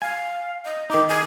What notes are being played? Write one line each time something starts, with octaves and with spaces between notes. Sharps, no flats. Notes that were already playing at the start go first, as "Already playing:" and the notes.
F5 G#5
D#5
D#3 D#4 D6
G#5